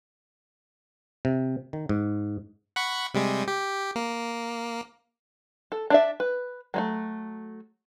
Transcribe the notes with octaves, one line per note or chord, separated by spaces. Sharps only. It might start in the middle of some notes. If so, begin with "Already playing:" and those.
C3
D#3
G#2
F#5 B5 C#6
C3 G3 G#3
G4
A#3
A4
D4 D5 E5
B4
F#3 G#3 A3